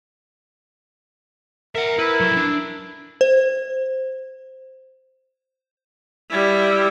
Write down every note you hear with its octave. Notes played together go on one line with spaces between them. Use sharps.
A#4 E5 F#5
E4 B4
F#3 A4
D4
C5
G3 E4